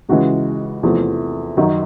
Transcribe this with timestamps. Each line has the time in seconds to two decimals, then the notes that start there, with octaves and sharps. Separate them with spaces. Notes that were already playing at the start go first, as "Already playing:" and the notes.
0.09 C#2 C#3 E3 G#3 F#4
0.83 E2 C3 F3 A3
1.57 F#2 D#3 F#3